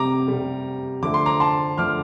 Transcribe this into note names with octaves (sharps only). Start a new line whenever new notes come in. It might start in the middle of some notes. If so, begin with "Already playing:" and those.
Already playing: C3 G3 A#5 D6
C3 G3
D3 F3 A3 D6
C6
A#5 D6
A5 C6
D3 F3 A3 D6 F6